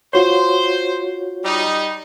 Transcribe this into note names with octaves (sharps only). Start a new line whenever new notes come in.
F4 F#4 C5 C#5
G3 D#4